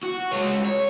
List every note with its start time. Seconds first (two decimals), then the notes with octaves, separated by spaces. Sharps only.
0.03 F#4
0.33 G#3 C#5
0.65 C#5